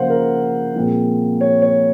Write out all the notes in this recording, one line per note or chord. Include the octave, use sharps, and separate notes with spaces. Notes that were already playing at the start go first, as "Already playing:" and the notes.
Already playing: C#3 F3 A#3 C5 F5 F#5
A#4
A#2 F3 G#3 C4
C#5
C#5